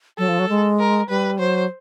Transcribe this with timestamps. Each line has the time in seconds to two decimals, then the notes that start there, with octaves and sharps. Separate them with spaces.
0.18 F#3 A4
0.29 F3
0.39 F#3
0.49 G#3
0.79 A#4
1.09 G3 B4
1.39 F#3 C5